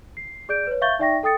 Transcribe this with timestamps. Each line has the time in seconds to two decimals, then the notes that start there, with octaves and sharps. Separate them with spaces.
0.17 C7
0.49 G#4 D5 G6 D7
0.67 B4 C#5
0.81 E5 F5 C#6 G6 A6 G7
0.99 D#4 D5 E5 G5 C#6 A#6
1.23 A4 G5 D#6 A6 C#7